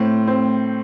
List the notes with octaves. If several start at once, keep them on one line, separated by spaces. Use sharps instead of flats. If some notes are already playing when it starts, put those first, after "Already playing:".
Already playing: A2 C4
C4